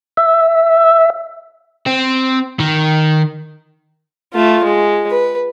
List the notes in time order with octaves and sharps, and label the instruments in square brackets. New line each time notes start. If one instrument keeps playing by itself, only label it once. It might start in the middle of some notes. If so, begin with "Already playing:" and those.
[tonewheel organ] E5
[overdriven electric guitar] C4
D#3
[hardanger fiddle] A3 F4
G#3
B4